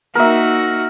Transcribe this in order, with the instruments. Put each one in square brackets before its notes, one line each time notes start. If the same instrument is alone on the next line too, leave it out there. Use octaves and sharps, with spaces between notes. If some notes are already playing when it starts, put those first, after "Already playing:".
[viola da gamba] A#3 D#4 [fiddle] F#4 [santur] A#4 E5